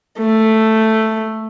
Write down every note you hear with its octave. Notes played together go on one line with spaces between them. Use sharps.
A3